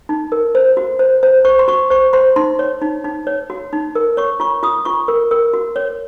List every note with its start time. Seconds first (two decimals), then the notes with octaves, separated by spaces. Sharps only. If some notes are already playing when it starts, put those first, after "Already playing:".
0.09 D#4
0.32 A#4
0.55 C5
0.77 F#4
0.99 C5
1.23 C5
1.45 C5 C#6
1.59 C6
1.68 F#4 C#6
1.90 C5 C#6
2.13 C5 C6
2.36 D#4 C6
2.59 C#5
2.82 D#4
3.04 D#4
3.27 C#5
3.50 F#4
3.73 D#4
3.95 A#4
4.17 C#5 C#6
4.40 F4 C#6
4.63 F4 D#6
4.85 F4 C#6
5.08 A#4
5.31 A#4
5.53 F#4
5.76 C#5